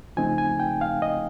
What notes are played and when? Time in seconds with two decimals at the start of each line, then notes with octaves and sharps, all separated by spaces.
0.17 C#3 F3 A3 C4 D#4 G#5
0.38 G#5
0.60 G5
0.81 F5
1.02 D#5